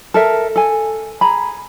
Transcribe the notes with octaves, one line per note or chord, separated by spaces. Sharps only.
A4 A#4 E5
A4 G#5
G#4 A#5 B5